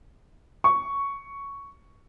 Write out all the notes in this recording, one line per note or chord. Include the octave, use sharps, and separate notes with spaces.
C#6